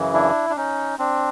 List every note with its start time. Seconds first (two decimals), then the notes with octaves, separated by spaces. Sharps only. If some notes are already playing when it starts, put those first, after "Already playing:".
Already playing: F#2 C#3 E3
0.14 D4 E4
0.50 D4
0.57 C#4 D#4
0.99 C4 D4